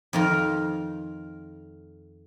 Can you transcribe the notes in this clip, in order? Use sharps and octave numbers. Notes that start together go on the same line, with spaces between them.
F2 D#3 F4 A#4